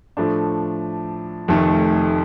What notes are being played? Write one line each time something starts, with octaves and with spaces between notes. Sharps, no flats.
A2 F3 A3 D4
F1 F2 D#3 A3